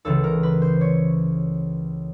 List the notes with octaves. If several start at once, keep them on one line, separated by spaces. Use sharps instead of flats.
C#2 C#3 E3 A4
A#4
B4
C5
C#5